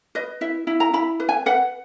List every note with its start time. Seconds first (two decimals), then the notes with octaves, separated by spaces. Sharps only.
0.15 B4 D#5
0.41 E4 E5
0.67 E4
0.80 A#5
0.93 E4 B5
1.20 B4
1.29 G#5
1.46 B4 F#5